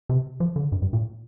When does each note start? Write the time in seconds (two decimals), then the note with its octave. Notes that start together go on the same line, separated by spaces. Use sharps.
0.09 C3
0.40 F3
0.56 D3
0.72 G2
0.82 G2
0.93 A#2